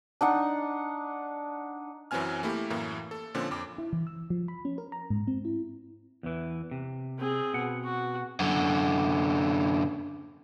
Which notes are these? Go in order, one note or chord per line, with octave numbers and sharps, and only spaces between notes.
D4 D#4 F#5
F#2 E3 F#3 C4 G#5 F6
A3 A#3 E4 G4
F#2 A2 E3 A#3
A4
A#2 D3 F3 C4 C#4
F2 D6
E4
E3
E6
F3
B5
C#4
A#4
A#5
G#2
C4
E4
E2 E3
C3
C4 G#4
B2 F#5
F#4
F#2 D3